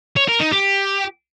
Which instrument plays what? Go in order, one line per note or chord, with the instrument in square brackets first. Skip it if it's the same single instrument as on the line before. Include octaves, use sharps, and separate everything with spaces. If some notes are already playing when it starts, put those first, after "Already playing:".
[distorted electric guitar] C#5
A#4
D#4
G4